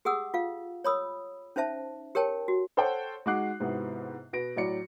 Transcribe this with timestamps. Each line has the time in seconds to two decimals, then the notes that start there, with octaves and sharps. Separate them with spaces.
0.05 G4 G#4 F#5 D#6 E6
0.34 F4 F5
0.84 C#5 B5 D#6 E6
1.56 C#4 D#4 C5 E5 A5
2.15 G4 A#4 C#5 G5 A5
2.48 F#4
2.77 A4 C5 C#5 F#5 G5
3.26 G#3 D#4 F#4 D6 F#6 C7
3.60 G#2 C3 B3 E4 F#4
4.33 B2 B4 A#6 D7
4.56 A2 F#3 D5 C#7